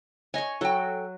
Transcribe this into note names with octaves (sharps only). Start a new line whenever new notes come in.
C#5 D#5 G#5 C#6
F#3 F#4 A4 G5